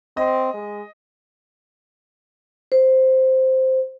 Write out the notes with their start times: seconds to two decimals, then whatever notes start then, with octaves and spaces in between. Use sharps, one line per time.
0.17 C4 D#5
0.54 G#3
2.72 C5